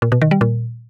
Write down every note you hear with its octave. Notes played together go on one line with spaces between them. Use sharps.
A#2
B2
D#3
G3
A#2